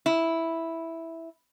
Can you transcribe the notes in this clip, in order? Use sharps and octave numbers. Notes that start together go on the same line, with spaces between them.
E4